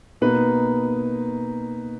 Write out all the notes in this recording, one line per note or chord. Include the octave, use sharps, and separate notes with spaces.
B2 A#3 D#4 B4